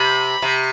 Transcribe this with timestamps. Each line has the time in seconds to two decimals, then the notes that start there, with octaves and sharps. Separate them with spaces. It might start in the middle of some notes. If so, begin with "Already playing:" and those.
Already playing: C3 B5
0.42 C3